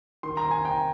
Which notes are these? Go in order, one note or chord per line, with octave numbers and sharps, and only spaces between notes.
D#3 C6
A#5
C3
G#5
C3 G5 A#5